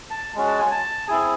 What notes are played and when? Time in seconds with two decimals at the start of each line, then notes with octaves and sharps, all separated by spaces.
0.10 A5
0.35 G#3 C#4 F#4
0.47 A5
0.59 G#5
0.71 A5
1.08 C4 E4 G#4 G#5